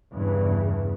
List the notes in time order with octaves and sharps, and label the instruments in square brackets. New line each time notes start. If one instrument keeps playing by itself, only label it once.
[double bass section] E2 G2 C#3 E3